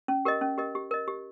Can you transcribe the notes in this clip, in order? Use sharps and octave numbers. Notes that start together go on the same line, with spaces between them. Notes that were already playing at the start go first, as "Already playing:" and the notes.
C#4
G4 A#4 D#5
C#4
G4 A#4 D#5
G4
A#4 D#5
G4